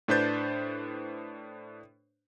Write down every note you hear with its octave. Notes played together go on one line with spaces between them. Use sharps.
A2 D4 B4 C5 G6 A6